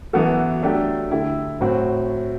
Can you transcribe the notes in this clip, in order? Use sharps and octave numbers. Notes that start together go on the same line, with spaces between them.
F#2 E3 B3 F#4 A4
F#3 A3 D4 G4
D3 A3 E4 G4
A2 F#3 C4 F#4